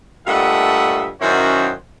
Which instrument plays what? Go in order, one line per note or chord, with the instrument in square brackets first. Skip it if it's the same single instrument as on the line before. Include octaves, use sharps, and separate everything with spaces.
[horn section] G2 A#2 A3 D#5 E5 F#5
F#2 D#3 C#4 E4 F#4 C5